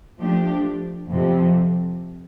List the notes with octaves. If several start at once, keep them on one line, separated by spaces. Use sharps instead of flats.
F3 A3 D4 G4
F2 C3 F3